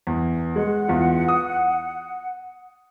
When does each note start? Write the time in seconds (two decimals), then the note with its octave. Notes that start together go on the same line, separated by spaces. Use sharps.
0.07 E2
0.56 G#3 F#5
0.89 E2 F4
1.28 D#6